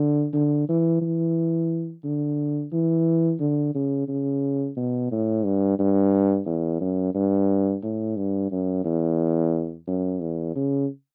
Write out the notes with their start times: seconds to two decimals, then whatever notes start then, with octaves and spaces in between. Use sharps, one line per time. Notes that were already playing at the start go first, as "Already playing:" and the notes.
Already playing: D3
0.34 D3
0.69 E3
1.02 E3
2.04 D3
2.73 E3
3.40 D3
3.75 C#3
4.08 C#3
4.77 B2
5.11 A2
5.45 G2
5.79 G2
6.46 E2
6.81 F#2
7.15 G2
7.83 A2
8.17 G2
8.51 F#2
8.85 E2
9.88 F#2
10.21 E2
10.56 C#3